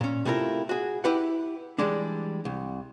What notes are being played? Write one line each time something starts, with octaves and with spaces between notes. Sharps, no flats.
A#2 C#4
C3 A3 E4 F4 A#4
F#4 G#4
E4 G4 B4 F#5
E3 G3 G#3 D4
C2